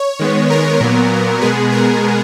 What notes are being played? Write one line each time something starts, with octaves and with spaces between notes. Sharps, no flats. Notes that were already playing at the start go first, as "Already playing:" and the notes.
Already playing: C#5
D#3 G#3 B3
A#4
A#2 F#3 B3
B2 G#3 B3 G#4
A#4